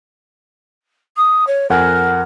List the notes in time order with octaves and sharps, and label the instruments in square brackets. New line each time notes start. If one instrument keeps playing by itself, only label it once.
[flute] D#6
C#5
[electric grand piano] F2 F#5 G#5 [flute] A#4